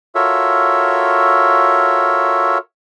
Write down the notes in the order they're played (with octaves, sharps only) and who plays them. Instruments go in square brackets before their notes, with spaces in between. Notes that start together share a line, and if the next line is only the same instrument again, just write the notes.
[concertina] F4 F#4 A4 A#4 C#5 E5